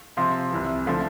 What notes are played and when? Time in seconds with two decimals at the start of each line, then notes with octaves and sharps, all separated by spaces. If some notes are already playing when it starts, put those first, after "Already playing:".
0.17 C3 F3 C4
0.52 C2 C3 E3
0.86 D3 F3 A3